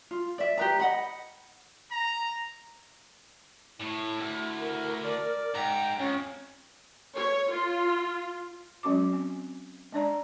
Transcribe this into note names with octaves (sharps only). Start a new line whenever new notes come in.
F4
D5 E5
G4 B4 A#5
D#5 F#5 B5
A#5
A2 E4
D2
A#4
D5
G#2 G5 A#5
F2 C#4
C#5
F4
F#3 G#3 C#4 F#4 D6
C4
G#3 D4 D5 A#5